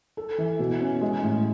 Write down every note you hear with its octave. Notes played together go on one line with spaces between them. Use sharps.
A4
E3
B2
C#4
G#3
A2